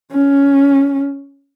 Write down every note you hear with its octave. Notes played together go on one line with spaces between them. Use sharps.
C#4